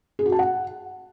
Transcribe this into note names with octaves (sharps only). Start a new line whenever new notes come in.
G#4
F#4
A5
F#5